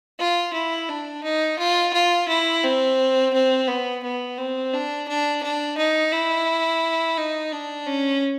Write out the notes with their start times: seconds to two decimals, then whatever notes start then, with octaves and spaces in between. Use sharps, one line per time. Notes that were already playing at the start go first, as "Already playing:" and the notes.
0.20 F4
0.53 E4
0.89 D4
1.24 D#4
1.59 F4
1.94 F4
2.28 E4
2.64 C4
3.34 C4
3.68 B3
4.03 B3
4.38 C4
4.73 D4
5.08 D4
5.43 D4
5.78 D#4
6.12 E4
7.18 D#4
7.52 D4
7.86 C#4